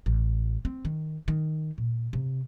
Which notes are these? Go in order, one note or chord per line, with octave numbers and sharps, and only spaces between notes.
A1
C4
D#3
D#3
A#2
C3